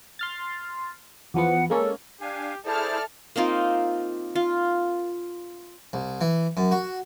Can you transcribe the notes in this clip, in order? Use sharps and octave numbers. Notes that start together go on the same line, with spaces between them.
C6 F6 A6
E2 F3 B3 F#5
G#3 A#3 C#4 A4
D4 G4 F5 G#5
E4 G#4 A4 C5 D5 E5 A5 F6
A#3 C4 D#4 F4
F4
C2
E3
F#2
F#4